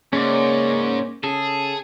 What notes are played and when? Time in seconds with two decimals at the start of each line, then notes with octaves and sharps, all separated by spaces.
0.13 G#2 C#3 A#3 C#4 D5
1.24 C#3 G#4 A4